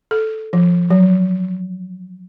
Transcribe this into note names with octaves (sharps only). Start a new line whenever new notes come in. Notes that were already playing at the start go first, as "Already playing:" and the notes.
A4
F3
F#3